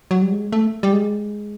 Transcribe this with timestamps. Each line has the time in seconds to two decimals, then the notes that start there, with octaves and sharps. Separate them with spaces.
0.11 F#3
0.22 G3
0.32 G#3
0.52 A3
0.83 G3
0.93 G#3